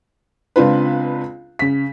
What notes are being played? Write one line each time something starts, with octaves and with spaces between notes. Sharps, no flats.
C#2 C4 D4 F4 B4
C#3 B6